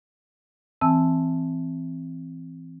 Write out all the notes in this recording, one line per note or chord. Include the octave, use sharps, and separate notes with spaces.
E3 C4 G#5 A5 E6